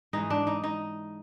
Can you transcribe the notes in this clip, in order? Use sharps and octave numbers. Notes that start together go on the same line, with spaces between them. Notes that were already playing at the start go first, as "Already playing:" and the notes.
G#2 E3 G#3 D#4
D4
D#4
D#4